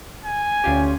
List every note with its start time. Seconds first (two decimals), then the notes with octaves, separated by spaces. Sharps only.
0.25 G#5
0.64 D2 C#4 F4 G4